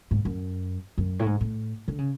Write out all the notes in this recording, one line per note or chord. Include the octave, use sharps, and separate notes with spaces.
G#2
F#2
F#2
A2
G#2
A2
D3
C#3